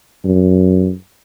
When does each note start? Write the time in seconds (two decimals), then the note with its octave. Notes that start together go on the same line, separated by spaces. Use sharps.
0.25 F#2